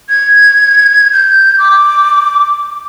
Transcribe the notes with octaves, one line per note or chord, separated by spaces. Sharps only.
G#6
G6
D6